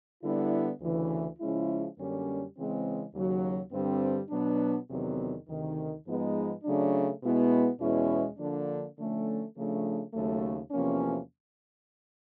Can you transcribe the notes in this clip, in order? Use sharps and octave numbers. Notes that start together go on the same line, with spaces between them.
D3 G3 B3 E4
D2 C#3 E3
C#3 F3 G#3 C#4 E4
F#2 D3 G3 A#3 C#4
C#3 E3 G#3 C4
D#2 C#3 F#3
G2 D3 G3 C4
B2 F#3 B3 D4
E2 C3 D#3 F#3 B3
D2 C3 D#3
G#2 F3 G#3 B3 D#4
C#3 F#3 A3 D4
B2 G#3 B3 E4
E2 B2 G#3 C#4 E4
D3 F3 A#3 D4
D3 F3 A3 C#4
C#3 F3 A3 D4
D#2 C#3 F#3 A3
E2 C3 F3 A#3 C#4